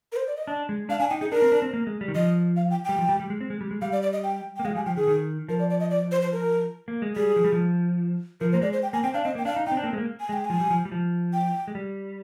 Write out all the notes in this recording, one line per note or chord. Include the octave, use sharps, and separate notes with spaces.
A#4
C5
D5
D#5
D4
G#3
D4 F5
D4 G#5
D#4 G5
D#4 G#4
D4 A#4
C4
D4
C4
A#3
G#3
G3
D#3
F3 D#5
F5
G5
G3 G5
F3
G3
G3
G#3
C4
G#3
G3
G#3
G3 F5
D5
D5
D#5
G5
A#3 G5
G#3 F5
F3
G3 G#5
F3 G5
D#3 G#4
D#3
F3 A#4
D5
D5
D#5
D5
C5
C5
A#4
A#3
G#3
G3 G#4
F3
G3
F3
F3 A#4
A#3 C5
G#3 D5
C5
G5
A#3 G#5
C4 G5
D4 F5
C4 D#5
A#3
G5
D4 F5
D#4
D#4 G5
C4
D4
A#3
C4
G#3
A#3
G#5
G#3 G5
G#5
F3
G3
F3
G3
F3
G5
G#3
G3